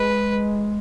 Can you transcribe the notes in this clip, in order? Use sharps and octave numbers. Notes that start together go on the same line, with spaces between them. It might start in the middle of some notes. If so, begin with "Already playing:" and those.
Already playing: G#3 B4